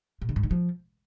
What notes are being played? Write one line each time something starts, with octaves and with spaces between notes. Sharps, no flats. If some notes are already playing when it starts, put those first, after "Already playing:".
A#2
D3
G#2
D3
F3